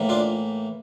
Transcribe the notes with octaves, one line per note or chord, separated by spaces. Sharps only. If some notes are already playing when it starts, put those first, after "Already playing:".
Already playing: A2 E3 A#3
D4 F4